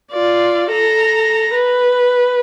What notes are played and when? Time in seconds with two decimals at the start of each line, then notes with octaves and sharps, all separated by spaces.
0.12 F4 D5
0.72 A4 A#5
1.54 B4